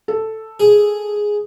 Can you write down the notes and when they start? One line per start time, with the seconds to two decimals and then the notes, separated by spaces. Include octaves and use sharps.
0.08 A4
0.60 G#4